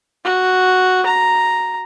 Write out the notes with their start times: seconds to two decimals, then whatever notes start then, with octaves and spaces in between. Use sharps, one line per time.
0.24 F#4
1.06 A#5